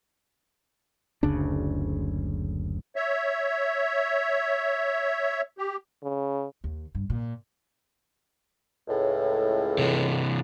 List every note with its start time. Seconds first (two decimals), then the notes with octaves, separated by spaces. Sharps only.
1.23 F#1 D2 C#3 D4
2.96 C#5 E5
5.58 G4
6.03 C#3
6.64 D#2
6.95 G2
7.10 A#2
8.88 C#2 A2
9.78 C3 E3